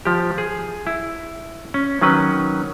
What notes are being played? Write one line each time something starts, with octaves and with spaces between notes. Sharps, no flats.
F3 G4
G#4
E4
C#4
D#3 F#3 C#4 B4